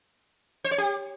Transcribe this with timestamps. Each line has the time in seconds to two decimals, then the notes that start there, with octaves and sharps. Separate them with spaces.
0.64 C5
0.71 C#5
0.78 G4